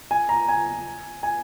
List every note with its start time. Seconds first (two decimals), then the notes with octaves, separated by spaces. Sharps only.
0.11 G#5
0.29 A#5
0.48 G#5
1.23 G#5